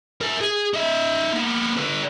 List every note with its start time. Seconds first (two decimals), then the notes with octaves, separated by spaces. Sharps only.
0.21 A#4 E5
0.41 G#4
0.74 D#4 E5
1.33 A#3 B3
1.77 D3 B4